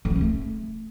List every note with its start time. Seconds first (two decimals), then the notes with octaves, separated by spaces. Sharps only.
0.05 D3
0.10 C#4
0.15 D3
0.21 A3